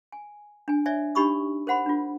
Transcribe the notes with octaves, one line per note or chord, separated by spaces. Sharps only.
G#5
D4 G#5
C#5 D5 E5 G#5
D4 D#4 G4 B5 C#6 D#6
A#4 C5 F#5 B5 C6
D4 F4